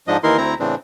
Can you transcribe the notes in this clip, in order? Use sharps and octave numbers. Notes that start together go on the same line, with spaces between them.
G#2 F3 D4 D#5
D#2 E3 D#4 E4 A#4 C6
D2 C4 E4 A#5
A2 C#3 E3 C4 D4